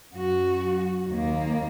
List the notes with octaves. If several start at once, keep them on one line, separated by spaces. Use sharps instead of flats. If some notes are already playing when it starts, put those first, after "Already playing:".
F#2 F#4
D#2 A#3